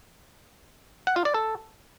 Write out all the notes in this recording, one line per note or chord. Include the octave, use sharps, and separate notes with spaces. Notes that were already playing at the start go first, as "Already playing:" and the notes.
F#5
F4
D5
A4